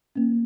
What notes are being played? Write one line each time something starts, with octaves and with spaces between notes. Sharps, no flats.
A#3 C#4